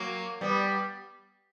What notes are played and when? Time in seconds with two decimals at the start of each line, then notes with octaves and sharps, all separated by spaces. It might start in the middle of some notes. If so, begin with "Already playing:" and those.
Already playing: F#3 A#3
0.41 G3 B3